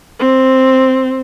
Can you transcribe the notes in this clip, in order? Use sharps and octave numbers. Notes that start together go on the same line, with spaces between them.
C4